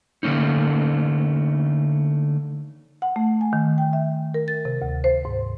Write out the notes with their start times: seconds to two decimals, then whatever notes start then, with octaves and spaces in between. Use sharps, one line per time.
0.23 D3 A3 A#3 C#4 D#4
3.02 F#5
3.16 A3
3.41 G#5
3.53 D#3
3.78 G5
3.93 E5
4.34 A#4
4.48 A6
4.65 C3
4.82 D2
5.04 C5
5.25 G#2